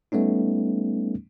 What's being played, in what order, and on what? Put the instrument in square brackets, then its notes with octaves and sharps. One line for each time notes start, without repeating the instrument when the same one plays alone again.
[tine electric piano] G3 A3 B3 C#4 D#4